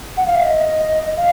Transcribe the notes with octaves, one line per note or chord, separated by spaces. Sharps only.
F#5
F5
E5
D#5
F5